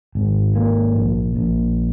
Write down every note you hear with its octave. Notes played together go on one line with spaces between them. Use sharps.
G#1
A#3
A#1
A#1